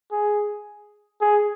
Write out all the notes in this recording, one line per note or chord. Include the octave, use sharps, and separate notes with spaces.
G#4
G#4